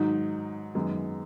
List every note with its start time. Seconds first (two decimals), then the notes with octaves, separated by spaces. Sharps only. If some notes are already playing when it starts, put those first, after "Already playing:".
Already playing: G#2 D#3 F#3 D#4
0.75 F#2 D#3 G#3 B3